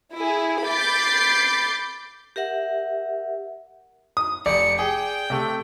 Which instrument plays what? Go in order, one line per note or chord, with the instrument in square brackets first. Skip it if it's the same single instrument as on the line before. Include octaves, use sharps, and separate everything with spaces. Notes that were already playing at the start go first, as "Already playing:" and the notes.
[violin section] E4 G#4
B5 D6 G6 A6 C7
[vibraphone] G4 A#4 E5 F#5
[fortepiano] D#6
[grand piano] F1 [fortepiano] D5 [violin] C#7
[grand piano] G#4 [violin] G5
[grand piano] C3 A3